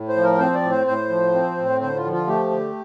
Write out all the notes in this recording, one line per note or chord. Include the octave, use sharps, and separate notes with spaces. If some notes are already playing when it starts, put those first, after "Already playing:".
Already playing: A2
C5
F3
A#4
C4 C5
D5
A2
C5
A2 C5
F3
C4
A2
D3 C5
F4
F3
F4
A3 G4
D3